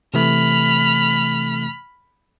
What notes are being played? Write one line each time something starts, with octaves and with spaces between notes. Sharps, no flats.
C3 E3 A3 B5 F6